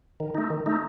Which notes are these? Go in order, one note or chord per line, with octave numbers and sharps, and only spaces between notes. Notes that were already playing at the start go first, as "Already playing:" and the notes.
D#3
A3 D#4
D#3
A3 D#4